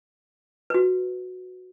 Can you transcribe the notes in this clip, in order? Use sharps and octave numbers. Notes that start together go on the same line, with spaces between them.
F#4 B4